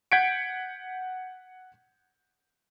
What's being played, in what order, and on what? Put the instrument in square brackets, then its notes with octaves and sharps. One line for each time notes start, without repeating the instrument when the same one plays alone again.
[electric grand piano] F#5 G6 G#6 B6 C#7 D7